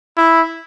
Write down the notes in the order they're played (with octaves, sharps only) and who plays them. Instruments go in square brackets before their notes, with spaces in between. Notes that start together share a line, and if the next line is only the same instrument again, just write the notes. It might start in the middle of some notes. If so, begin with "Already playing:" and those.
[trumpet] E4